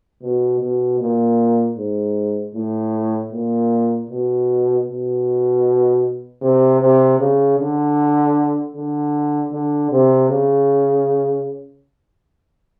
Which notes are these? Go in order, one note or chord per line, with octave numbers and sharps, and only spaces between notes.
B2
B2
A#2
G#2
A2
A#2
B2
B2
C3
C3
C#3
D3
D3
D3
C3
C#3